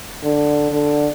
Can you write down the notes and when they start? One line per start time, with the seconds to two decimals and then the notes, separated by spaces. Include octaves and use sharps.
0.23 D3
0.71 D3